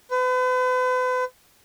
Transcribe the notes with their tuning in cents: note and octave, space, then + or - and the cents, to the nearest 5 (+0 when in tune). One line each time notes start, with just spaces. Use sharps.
B4 +40